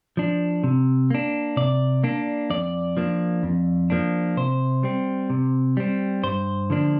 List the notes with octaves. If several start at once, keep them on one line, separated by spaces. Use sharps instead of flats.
F3 D4
C3
A#3 D4
C3 D5
A#3 D4
F2 D5
F3 A#3 D4
F2
F3 A#3 D4
C3 C5
G3 C4
C3
G3 C4
G2 C5
D3 F3 A#3 D4